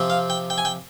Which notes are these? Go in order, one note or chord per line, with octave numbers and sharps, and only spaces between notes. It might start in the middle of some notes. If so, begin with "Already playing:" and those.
Already playing: C3 F3 C4
F5
G5
G5
G#5
G5